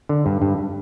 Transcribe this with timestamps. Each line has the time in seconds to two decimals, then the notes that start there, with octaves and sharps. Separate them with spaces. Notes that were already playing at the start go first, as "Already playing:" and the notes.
0.09 D3
0.26 G2
0.42 G2